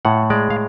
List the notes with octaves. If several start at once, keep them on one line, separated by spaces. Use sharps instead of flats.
A2 F#5
G#3 D5
F5